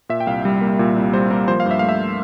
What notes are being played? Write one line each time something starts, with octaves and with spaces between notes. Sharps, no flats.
A#2 E5
G5
C2 F5
G3
A#3
A#2
C2
G3 C5
A#3 A#4
F3 C5
F5
G2
E5
A3 F5
E5